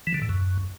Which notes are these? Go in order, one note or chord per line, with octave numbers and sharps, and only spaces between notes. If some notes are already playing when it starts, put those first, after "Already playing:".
E3
D3
A2
F#2